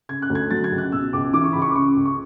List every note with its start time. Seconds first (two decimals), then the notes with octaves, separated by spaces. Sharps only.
0.09 C#3 G#6
0.22 F#6
0.30 D2
0.35 G#6
0.50 F#3 A6
0.64 G#6
0.71 C#2
0.78 F#6
0.92 B2 E6
1.13 C#2 D6
1.34 E3 D6
1.44 C#6
1.53 C#2 B5
1.62 C#6
1.70 D6
1.75 C#3 C#6
1.96 C#2
2.06 C#6